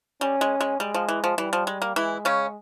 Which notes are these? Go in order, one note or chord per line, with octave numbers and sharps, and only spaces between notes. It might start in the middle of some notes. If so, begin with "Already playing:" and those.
G3 C#4
G#3
G#3
G3 G#3
F3
E3
F3
E3 G3
F3
G#3
A#3
E3 G#3 E4
C#3 C#4